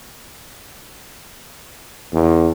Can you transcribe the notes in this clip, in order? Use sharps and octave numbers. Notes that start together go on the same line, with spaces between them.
E2